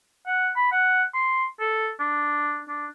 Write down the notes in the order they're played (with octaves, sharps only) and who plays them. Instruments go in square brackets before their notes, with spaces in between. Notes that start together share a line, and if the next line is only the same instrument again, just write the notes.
[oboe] F#5
B5
F#5
C6
A4
D4
D4